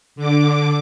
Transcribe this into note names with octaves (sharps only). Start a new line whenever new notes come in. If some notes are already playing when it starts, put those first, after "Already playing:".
D3 D6